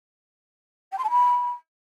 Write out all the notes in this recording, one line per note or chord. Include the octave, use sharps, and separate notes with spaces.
G5
C6
A5
B5